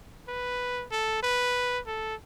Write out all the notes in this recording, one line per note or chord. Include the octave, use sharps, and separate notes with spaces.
B4
A4
B4
A4